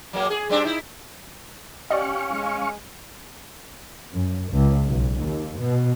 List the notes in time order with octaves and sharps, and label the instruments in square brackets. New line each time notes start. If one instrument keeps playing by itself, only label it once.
[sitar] F#3 G#3 A#3
G#4
G3 C4 D4
D#4 E4
[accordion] C#4 [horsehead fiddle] G4 F#5 [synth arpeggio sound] D5 D#5 [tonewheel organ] F5 C#6
[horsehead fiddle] G#3 G#5
[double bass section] F#2
C#2
B1
D#2
B2